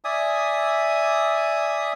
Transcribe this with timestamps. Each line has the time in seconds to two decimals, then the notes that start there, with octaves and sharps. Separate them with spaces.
0.05 D5 E5 G#5 D#6